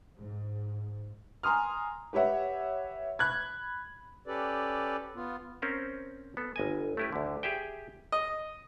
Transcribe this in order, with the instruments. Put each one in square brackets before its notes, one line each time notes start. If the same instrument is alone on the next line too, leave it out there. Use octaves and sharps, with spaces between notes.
[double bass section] G#2
[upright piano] G#5 A#5 C6 D#6 F6
G4 B4 C#5 E5 F#5
B5 F#6 G#6
[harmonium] C#4 G4 A4 B4 D5
B3 F4
[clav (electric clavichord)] C4 C#4 A#4 C5
B3 A4
G1 D#5 G#5
A3 C#4 E4 G4 B4
D2 D3
G4 G#4 E5 G5
[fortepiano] D#5